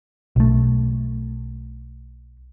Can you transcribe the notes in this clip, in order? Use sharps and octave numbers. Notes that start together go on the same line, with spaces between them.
B1 A3